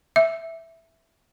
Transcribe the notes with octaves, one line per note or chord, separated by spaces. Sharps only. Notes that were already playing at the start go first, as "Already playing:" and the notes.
E5